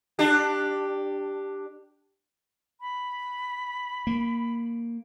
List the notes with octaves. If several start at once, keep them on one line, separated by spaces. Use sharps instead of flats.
D4 G4
B5
A#3